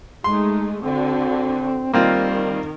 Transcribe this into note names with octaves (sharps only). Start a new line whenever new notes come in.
G#3 A3 D#4 C6
D3 C4 F#4
D#3 G3 A#3 C4 F4 A#4